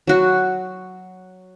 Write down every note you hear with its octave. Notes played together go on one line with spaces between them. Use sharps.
F#3 F#4